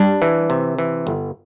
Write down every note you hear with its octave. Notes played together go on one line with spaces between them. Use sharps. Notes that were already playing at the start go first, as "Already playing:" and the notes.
Already playing: G3 D4
E3
C3
E3
G1